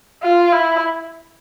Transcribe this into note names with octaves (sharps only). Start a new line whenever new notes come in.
F4
E4